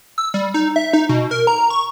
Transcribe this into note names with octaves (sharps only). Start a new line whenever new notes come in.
E6
G3
D#4
E5
D#4
B2
A#4
A#5
C#6